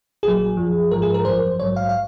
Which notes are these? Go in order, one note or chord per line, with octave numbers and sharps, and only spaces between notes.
A#1 A#2 F#3 G#4
F#2 F3
G#1 G#2 F3 A#4
G#4
A#4
G#1 F#2 F3 C5
A#1 G#2 F#3 C#5
F5
F5